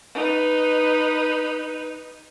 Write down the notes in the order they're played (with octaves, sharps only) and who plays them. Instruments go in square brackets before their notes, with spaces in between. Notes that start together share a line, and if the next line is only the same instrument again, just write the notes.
[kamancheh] D#4 B4